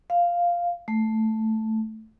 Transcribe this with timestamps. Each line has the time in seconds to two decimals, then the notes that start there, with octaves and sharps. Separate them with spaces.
0.10 F5
0.88 A3